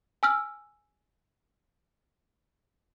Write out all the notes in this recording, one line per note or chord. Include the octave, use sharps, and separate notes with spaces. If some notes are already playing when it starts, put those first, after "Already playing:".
G#5 E6 F6